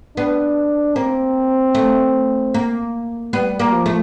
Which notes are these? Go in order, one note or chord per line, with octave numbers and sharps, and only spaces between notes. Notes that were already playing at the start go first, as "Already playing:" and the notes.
B3 D4
A#3 C4
A3
A#3
G3 B3
A#3
F3
A3